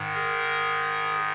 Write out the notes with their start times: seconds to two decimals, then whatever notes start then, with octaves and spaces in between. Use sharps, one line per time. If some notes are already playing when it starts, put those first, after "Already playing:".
Already playing: G#2 D#3
0.14 G#4 A#4